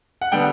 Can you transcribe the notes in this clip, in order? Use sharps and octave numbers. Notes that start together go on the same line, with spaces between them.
F#5
D3 G3 B3 G5